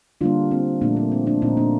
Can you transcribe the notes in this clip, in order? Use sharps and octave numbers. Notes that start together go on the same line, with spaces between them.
D3 G3 A#3 D4 F4
C4
A#2 F3 A3 A#3 D4
A#3
C4
A#3 D4
A#2 A3 C4 D#4
A#3 D4